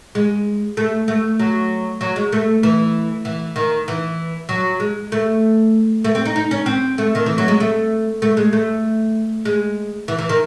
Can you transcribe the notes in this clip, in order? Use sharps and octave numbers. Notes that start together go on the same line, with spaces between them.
G#3
A3
A3
F#3
F#3
G#3
A3
E3
E3
D#3
E3
F#3
G#3
A3
A3
C4
D#4
D#4
C#4
C4
A3
D#3
E3
F#3
G#3
A3
A3
G#3
A3
G#3
E3
E3
D#3